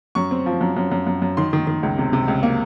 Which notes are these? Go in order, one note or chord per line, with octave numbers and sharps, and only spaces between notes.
F#2 C#6
C4
F3
F#2
F#2
F#2
F#2
F#2
D#3 C6
D#3
D#3
C#2
C3
C3
C#2
A#3